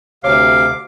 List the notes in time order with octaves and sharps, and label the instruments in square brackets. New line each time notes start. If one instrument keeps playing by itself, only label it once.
[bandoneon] D2 C3 D6 [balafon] C#5 [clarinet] F5